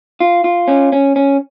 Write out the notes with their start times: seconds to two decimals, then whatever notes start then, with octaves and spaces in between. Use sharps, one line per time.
0.20 F4
0.44 F4
0.68 C#4
0.92 C#4
1.16 C#4